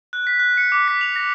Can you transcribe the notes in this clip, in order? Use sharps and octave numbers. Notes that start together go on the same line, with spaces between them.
F#6
B6
F#6
C#7
D6
B6
F7
A#6